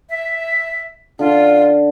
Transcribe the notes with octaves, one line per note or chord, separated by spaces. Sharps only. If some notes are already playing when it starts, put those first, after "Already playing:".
E5
D3 F4